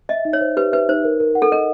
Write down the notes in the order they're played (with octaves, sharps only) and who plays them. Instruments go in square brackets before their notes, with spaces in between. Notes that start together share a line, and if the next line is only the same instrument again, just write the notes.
[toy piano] D#5 [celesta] E5
[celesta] D#4
[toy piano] C#5
[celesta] C5
[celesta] G4 [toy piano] B4
[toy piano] B4 [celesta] E5
[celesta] D#4 [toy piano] C5
[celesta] A#4
A#4
F#5
[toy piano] A4
[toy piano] A#4 [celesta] D#5